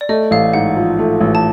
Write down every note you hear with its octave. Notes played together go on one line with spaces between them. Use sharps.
D5
A3 D#5
A1 F5
G#2 F#5
F3
A3
A1
A5